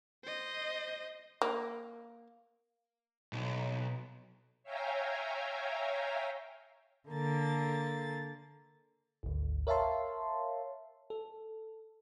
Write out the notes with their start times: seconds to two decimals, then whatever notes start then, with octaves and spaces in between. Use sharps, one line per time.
0.24 C5 D#5
1.42 A#3
3.33 B1
4.63 C#5 E5 F5 G5 G#5 A#5
7.10 D3 A#3 A6
9.23 G#1 D2
9.67 A#4 C#5 E5 F5 A5 C6
11.10 A4